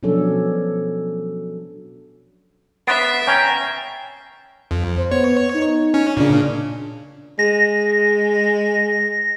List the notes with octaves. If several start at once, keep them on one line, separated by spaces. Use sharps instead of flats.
B2 F3 F#3 C#4 D4 A4
B3 E5 A6 C7 D7
C#4 G5 A#5 G6
F2
C5
B3 C#5
D#4
C#4
A#2 C#3 D4
G#3 A#6